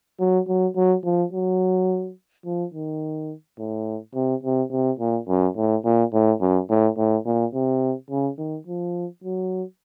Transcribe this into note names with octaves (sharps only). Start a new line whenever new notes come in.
F#3
F#3
F#3
F3
F#3
F3
D#3
A2
C3
C3
C3
A#2
F#2
A2
A#2
A2
F#2
A2
A2
A#2
C3
C#3
D#3
F3
F#3